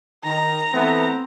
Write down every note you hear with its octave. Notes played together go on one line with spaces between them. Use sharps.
D#3 A#5
E3 A3 B3 C4